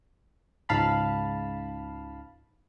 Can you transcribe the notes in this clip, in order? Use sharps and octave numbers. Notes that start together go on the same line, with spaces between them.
C#2 G#2 F5 A5 B5